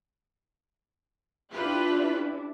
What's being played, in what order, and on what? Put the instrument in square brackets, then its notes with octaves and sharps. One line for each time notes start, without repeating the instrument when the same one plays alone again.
[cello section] D4 E4 [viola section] F4 G4 B4